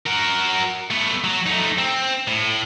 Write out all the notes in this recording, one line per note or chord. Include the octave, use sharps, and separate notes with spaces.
F#4 A#4
A3 B3
F#3
A3 D#4
C4
A2